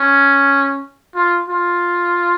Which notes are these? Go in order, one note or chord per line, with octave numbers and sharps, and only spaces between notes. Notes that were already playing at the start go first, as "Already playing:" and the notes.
Already playing: C#4
F4
F4